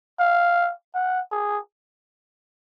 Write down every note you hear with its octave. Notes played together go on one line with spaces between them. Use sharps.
F5
F#5
G#4